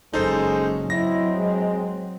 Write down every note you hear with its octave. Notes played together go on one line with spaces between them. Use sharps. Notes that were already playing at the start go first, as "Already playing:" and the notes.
F#1 G#3 C#4 D#4 A4 C5
F#3 C4 E4 D#5 A#6
G#3